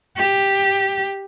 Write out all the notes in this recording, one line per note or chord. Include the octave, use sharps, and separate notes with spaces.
G4